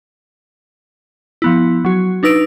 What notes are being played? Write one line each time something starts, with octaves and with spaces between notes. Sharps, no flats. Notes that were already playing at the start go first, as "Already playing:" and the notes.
F3 B3 E4
F#3 F#4
D4 D#4 B4 E6 D7